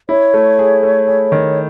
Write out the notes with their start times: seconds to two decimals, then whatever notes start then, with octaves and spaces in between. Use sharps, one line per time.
0.09 E4 C#5
0.34 A3
0.59 G#4
0.83 A3
1.08 G#4
1.32 D#3